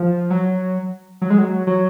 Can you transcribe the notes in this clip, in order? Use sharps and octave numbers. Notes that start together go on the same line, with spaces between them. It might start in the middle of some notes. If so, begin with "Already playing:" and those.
Already playing: F3
F#3
F#3
G#3
F#3
F#3